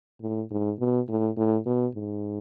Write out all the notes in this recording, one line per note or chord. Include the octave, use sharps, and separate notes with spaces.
A2
G#2
B2
A2
A2
B2
G#2